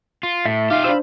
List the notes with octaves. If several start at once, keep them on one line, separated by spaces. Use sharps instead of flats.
F4
A2 E5 A6
D#4 F4 G4 F5
D4 C5 B5 E6